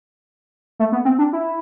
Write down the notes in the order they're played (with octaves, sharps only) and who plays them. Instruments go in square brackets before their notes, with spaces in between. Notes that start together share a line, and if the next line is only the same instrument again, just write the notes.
[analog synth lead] A3
B3
C4
D4
E4